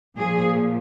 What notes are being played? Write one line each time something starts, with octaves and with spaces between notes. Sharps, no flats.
A#2 F3 G#4